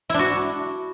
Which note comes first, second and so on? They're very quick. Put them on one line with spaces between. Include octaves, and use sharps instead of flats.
E4 D4 F#4